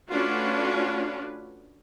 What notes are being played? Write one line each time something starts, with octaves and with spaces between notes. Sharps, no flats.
A3 C#4 D4 F4 F#4 B4